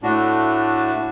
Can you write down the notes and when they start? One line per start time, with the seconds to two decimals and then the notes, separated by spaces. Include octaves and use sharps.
0.02 A2 A3 D4 F#4
0.96 A2